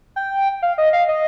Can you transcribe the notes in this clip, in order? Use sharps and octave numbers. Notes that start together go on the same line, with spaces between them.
G5
F5
D#5
F5
D#5